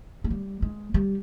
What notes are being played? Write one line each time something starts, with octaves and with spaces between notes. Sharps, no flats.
G#3
G3
G#3
G3